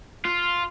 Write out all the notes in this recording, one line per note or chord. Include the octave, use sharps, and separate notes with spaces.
F4